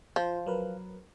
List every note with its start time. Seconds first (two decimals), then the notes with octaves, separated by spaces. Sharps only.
0.16 F3 F4 C5
0.46 F#3 A#4 B4